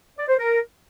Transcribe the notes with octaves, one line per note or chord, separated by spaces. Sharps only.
D5
C5
A#4